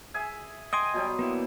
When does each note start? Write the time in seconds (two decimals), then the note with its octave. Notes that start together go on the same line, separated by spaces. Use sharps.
0.14 G#4 E5 G#5
0.73 D#5 G5 G#5 C6 D#6
0.94 B2 F#3 G3
1.19 A#3 B3 E4